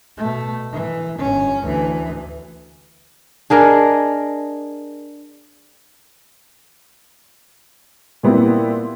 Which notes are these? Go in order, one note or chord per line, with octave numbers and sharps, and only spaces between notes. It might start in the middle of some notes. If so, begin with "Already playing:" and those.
B2 A3
E3
G1 C#4
D2 E3
D4 G#4 A#4 D#5
A#2 G3 B3 C4 E4